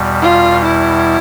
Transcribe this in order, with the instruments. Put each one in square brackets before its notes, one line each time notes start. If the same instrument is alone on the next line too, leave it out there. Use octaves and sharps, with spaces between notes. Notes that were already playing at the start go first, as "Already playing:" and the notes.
Already playing: [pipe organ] E2 B2 G3
[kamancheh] F4
E4